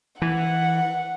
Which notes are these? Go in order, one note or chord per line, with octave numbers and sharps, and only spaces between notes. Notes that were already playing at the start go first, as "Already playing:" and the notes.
E3 F#5